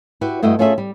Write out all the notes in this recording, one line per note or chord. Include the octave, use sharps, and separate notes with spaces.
E4 F#4 G4 B4
G2 A3 E4 F#4 D#5
A3 C#4 F4 G#4 A4 E5
G3